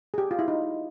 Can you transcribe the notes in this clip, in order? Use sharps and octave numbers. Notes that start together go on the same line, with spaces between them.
G#4
G4
F4
E4
D#4